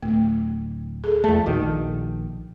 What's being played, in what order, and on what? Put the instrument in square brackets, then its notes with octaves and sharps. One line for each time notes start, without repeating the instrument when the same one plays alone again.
[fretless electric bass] D1 [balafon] A3
[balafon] G#4 A4
[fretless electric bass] E2 A3 [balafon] A5
[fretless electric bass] A#1 D#3 [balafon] F#4